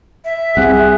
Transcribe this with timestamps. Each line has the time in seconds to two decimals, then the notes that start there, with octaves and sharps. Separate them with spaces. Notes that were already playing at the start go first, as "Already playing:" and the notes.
0.25 E5
0.57 C2 C3 G#4 F#5